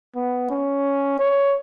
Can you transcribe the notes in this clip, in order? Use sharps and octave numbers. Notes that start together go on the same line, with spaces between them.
B3
C#4
C#5